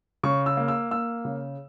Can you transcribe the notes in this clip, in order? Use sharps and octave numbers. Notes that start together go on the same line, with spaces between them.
C#3 C#6
E6
A#3
E6
A#3 E6
C#3